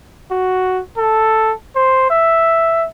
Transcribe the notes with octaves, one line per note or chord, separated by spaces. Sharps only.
F#4
A4
C5
E5